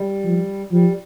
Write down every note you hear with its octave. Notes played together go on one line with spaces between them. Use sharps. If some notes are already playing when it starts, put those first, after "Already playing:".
Already playing: G3
F3
F3 G3